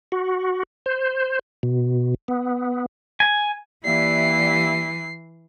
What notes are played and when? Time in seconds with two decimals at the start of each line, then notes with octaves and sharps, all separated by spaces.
0.12 F#4
0.86 C5
1.63 B2
2.28 B3
3.20 G#5
3.85 E3 G3 A#3 E5 C7